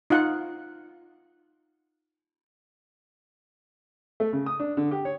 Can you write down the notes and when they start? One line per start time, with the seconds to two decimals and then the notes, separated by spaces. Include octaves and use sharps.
0.10 D#4 F4 F#5
4.20 A3
4.33 C#3
4.46 D#6
4.60 D4
4.77 D3
4.91 G4
5.05 C#5